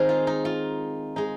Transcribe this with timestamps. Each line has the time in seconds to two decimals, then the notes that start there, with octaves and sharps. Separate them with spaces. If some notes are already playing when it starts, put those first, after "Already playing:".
Already playing: D#3 G#3 C4 D#4 G#4 A#4
0.09 F4
0.27 D#4
0.45 F4
1.16 G#3 D#4